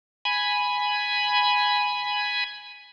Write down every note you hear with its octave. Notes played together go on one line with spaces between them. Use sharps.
G#5 B5